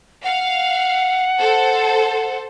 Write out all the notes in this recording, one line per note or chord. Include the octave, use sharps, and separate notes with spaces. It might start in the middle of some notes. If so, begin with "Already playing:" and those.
F5 F#5
A4 C5